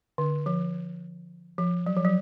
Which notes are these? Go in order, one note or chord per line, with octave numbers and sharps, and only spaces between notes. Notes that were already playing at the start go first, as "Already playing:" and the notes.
D3
F3
F3
F#3
F3
F#3